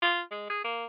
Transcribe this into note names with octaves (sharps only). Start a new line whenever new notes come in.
F4
G#3
G#4
A#3